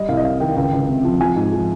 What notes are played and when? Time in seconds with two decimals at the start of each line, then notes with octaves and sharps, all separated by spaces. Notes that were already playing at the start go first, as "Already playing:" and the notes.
Already playing: G3 D#5
0.09 C2 F5
0.17 D#5
0.24 C3 F5
0.40 D#3 G5
0.56 C#2 G5
0.73 C#2
0.89 C3
1.04 F3
1.20 F3 G#5
1.36 G#2
1.52 F3